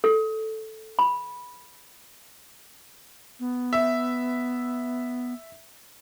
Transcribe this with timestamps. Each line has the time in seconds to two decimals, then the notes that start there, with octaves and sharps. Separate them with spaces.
0.04 A4
0.99 B5
3.40 B3
3.73 E5